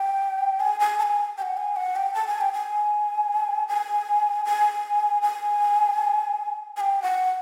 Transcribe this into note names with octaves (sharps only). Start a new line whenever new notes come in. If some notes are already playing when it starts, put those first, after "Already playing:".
Already playing: G5
G#5
G#5
A5
G#5
G5
F#5
G#5
F#5
G5
A5
G#5
G5
G#5
G#5
G#5
G#5
G#5
G5
F#5